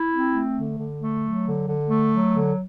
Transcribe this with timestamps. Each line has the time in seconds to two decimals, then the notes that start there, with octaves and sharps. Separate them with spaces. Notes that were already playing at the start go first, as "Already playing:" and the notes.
Already playing: E4
0.11 C4
0.34 A3
0.55 D3
0.77 D3
1.01 A3
1.23 F#3
1.45 D3
1.67 D3
1.89 A3
2.12 F#3
2.33 D3